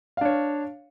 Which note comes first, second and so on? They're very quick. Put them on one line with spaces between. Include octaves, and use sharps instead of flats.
F5 D4 C#5